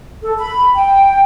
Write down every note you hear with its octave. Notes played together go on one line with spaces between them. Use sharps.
A4
B5
G5